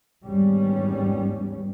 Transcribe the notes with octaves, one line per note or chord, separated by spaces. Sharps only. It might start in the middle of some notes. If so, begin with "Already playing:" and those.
G#1 E2 G3 C#4